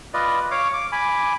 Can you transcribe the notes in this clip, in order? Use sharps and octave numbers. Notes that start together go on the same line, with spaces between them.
F4 B4 D5 D#5
C#5 F5 D6
D6
G#5 B5 D6